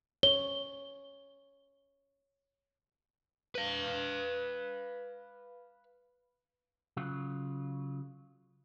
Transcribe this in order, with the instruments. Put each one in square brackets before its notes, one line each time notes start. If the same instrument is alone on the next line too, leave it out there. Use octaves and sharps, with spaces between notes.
[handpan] C#5 [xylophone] G7
[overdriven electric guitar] B4 F5
[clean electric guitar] C#3 F#3 F4